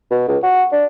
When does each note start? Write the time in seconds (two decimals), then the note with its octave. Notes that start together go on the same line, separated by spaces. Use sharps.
0.11 B2
0.28 C#2
0.43 F#4
0.72 D4